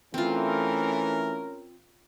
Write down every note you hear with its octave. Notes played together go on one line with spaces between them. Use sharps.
E3 A3 C4 C#4 F4 A#4